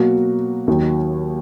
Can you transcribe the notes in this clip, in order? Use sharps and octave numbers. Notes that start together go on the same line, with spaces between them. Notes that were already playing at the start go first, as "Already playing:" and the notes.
Already playing: B2 F#3 A#3 F#4
D#2 D#3 F#3